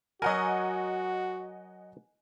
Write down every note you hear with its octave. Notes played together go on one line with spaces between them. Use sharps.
F#3 F#4 A#4 D#5 F#5 G#5